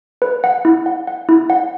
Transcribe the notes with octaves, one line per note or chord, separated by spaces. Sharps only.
B4
F#5
E4
F#5
F#5
E4
F#5